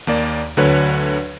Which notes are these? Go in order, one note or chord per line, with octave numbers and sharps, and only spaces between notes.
D#2 A#3 D5
D2 D3 F#3 B4 C#5